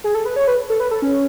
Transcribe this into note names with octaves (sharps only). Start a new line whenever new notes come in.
G#4
A4
B4
C#5
B4
A4
B4
A4
C#4